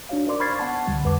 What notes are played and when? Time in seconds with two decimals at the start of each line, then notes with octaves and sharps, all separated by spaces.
0.09 D4 D#4 F#4 C#5 F5
0.27 A#4 C5 D5 C6 D6
0.40 B5 C#6 F6 G#6 A6 C7
0.59 B3 F#5 A5
0.87 C#2 D3 G3
1.04 F2 B4 F#5 D6